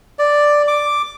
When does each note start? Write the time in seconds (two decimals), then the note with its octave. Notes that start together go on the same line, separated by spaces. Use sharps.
0.19 D5
0.68 D6